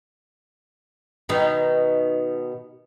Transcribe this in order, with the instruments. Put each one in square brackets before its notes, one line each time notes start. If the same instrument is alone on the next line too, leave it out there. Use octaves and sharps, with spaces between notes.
[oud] B2 D#3 D#4